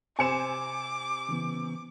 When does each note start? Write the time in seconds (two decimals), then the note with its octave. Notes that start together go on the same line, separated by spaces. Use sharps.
0.19 C3 C5 G#5 D6 C#7 E7
1.29 C#3 E3 B3